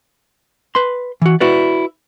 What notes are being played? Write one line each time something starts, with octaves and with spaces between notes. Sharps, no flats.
B4 C6
E3 F#4
E4 F#4 B4 D5